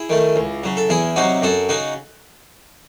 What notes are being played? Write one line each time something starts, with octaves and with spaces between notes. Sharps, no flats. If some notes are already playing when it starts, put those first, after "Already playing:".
Already playing: E4 G#4
D#3 A3
C#2
C#3 F#3
A4
E2 E4 G#4
C3 F#3 D#4 F#4
F#2 F#4 A4
C#3 D#4 F#4